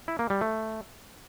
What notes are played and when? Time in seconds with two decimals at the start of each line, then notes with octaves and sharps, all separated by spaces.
0.08 E4
0.19 A#3
0.30 G3
0.41 A3